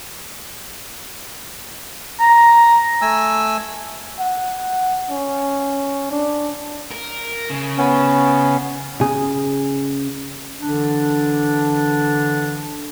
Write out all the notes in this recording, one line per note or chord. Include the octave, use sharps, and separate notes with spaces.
A#5
A3 G#5 E6
F#5
C#4
D4
A#4
C#3
B3 C#4
C#3 G#4
D3 E3 D4